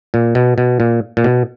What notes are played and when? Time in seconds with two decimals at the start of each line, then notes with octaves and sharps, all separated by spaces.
0.14 A#2
0.35 B2
0.58 B2
0.80 A#2
1.17 A#2
1.24 B2